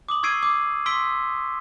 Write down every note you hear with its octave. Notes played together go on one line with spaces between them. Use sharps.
D6 D#6 F#7
C#6 E6 G#6 C7 D7 D#7
D6
C6 E6 B6 D7 G7